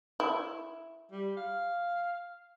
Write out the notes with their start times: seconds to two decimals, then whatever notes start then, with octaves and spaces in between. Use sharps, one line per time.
0.20 E4
1.11 G3
1.37 F5